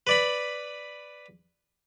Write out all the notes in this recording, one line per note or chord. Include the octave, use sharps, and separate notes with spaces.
B4 D5 B5